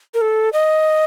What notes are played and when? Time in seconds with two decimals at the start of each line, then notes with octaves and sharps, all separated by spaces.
0.14 A#4
0.21 A4
0.53 D#5